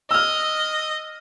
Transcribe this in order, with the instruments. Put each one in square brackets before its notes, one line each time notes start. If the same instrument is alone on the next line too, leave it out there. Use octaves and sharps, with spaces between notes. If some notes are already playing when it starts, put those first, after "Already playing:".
[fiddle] D#5 [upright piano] E6 F6